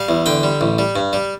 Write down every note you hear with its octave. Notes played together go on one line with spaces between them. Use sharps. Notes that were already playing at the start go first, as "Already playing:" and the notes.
Already playing: G3 F5
E2
D3 G5
G3
A1
G3
G2
G3